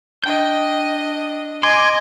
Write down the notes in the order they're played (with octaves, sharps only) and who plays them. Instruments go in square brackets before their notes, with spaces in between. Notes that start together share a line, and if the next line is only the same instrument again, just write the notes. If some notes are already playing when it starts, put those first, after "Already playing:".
[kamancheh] D4 D#5 [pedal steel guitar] G5 G6
[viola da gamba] D#5 [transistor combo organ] G#5 D6 [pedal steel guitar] C6